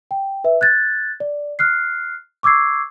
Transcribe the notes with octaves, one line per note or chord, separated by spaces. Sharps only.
G5
B4 E5
F#6 G#6 A6
D5
F6 F#6 C7
C#6 D6 E6 G#6 C7